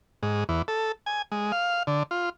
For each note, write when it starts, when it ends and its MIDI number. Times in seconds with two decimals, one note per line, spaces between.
0.23 0.44 44
0.49 0.62 40
0.68 0.92 69
1.06 1.22 80
1.32 1.52 56
1.52 1.83 77
1.87 2.03 50
2.11 2.29 65